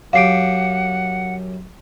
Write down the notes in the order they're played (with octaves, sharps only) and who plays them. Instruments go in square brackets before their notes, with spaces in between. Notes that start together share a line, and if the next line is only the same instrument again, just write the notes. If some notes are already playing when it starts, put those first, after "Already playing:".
[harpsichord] F#2 G4 [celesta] F5 C7 D7 [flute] F#5